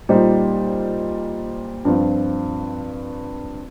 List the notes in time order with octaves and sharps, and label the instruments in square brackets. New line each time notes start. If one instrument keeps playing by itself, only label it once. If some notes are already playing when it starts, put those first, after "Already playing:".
[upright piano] A#2 G3 D#4 C5
G2 F3 C4 F4